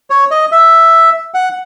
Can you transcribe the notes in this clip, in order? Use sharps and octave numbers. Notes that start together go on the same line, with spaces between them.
C#5
D#5
E5
F#5